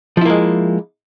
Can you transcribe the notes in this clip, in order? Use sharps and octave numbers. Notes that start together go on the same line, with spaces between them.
F3 G#3 A#3 E4